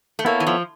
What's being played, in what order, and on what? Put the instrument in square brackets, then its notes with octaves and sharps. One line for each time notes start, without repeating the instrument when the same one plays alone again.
[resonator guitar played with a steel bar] A3
[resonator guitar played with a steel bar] A#3 [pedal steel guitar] B3 E4 A4 C#5
[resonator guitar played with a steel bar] E3
F3